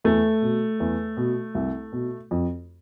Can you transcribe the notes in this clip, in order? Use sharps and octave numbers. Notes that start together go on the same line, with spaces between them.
E2 A3
B2
E2
B2
C2
B2
F2